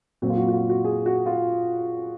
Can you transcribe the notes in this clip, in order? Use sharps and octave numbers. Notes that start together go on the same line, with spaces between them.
A#2 F#3 C4 F#4
F4
F#4
F#4
F4
F#4
G#4
F#4
F4